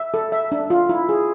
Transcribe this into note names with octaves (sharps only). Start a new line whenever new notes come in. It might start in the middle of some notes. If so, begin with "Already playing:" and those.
Already playing: E5
A4
E5
D4
F4
E4
G#4